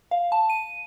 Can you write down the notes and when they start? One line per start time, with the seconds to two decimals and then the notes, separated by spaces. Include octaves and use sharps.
0.11 F5
0.32 A5
0.50 D#7